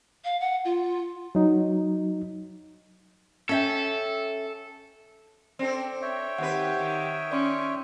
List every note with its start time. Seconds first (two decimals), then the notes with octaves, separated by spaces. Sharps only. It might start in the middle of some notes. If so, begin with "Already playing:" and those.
0.24 F5
0.40 F#5
0.64 F4
1.35 F#3 D#4
3.49 C#4 A4 E5 G5
5.59 C4 D4 A4
6.02 C#5 E5 G5
6.38 D#2 C4 G4 B4 F#5
6.79 D#3
7.31 C#4 D5 C6 C#6